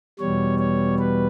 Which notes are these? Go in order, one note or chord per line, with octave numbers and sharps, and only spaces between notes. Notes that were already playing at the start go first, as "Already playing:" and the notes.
E2 B2 G3 C#5
C#5
B4